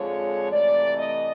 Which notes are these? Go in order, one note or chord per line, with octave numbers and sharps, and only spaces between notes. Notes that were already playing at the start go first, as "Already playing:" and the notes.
Already playing: F2 D3 F3 G#3 C#5
C3 E3 A3 D5
D#5